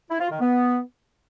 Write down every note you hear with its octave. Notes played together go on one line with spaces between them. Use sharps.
E4
F4
D#3
B3